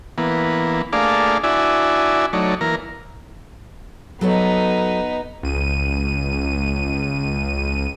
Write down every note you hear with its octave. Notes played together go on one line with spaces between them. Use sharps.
E3 A#3 B3
A3 A#3 D4 G#4 D5 F5
D4 E4 F#4 D5 E5 G#5
F#3 A3 D#4 C#5 D5
E3 A#3 A#4
F#3 B3 D#4 A4 C#5
C#2 D#7